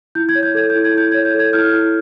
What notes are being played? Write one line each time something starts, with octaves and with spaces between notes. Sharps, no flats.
E4 G6
G#6
C#5
G6
A4 G#6
G6
E4
G#6
E4 G6
C#5 G#6
G6
A4
G#6
E4 F6 G6
E4